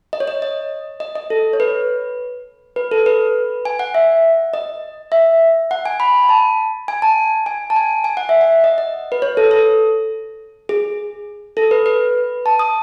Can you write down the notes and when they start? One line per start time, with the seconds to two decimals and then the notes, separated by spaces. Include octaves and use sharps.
0.13 D#5
0.20 C#5
0.27 D#5
0.42 D#5
1.00 D#5
1.15 D#5
1.30 A4
1.53 C#5
1.60 B4
2.76 B4
2.91 A4
3.06 B4
3.65 G#5
3.79 F#5
3.94 E5
4.54 D#5
5.12 E5
5.71 F#5
5.86 G#5
6.00 B5
6.29 A5
6.88 G#5
7.02 A5
7.46 G#5
7.70 A5
7.76 G#5
8.04 G#5
8.17 F#5
8.29 E5
8.41 F#5
8.64 D#5
8.78 D#5
9.12 B4
9.22 C#5
9.37 A4
9.51 A4
10.69 G#4
11.57 A4
11.71 B4
11.86 B4
12.46 A5
12.59 D#6